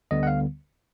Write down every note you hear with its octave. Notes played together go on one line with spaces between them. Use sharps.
D2 D3 G3 B3 D#5
F#5
F5